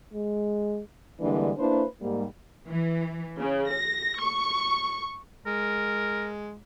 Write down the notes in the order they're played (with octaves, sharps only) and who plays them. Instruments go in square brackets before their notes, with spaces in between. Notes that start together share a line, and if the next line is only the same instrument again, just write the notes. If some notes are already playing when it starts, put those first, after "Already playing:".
[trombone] G#3
[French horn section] D3 E3 G3 G#3 A#3 D4
A#3 D4 E4 B4 C5
G#2 G3 A#3
[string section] E3
C#3
A#6
C#6
[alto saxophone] G#3 [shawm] A#4